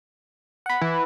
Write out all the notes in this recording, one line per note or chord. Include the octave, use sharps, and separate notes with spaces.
F#5 B5
E3